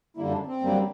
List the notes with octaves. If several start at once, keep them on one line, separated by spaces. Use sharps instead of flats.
F#2 D3 G3 A#3 E4
D4
C4
F#2 D3 G3 A#3